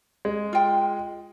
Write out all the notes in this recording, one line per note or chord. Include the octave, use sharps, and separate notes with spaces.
G#3
F4 G5